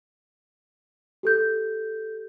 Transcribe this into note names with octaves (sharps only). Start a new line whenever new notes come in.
G4 A4 G6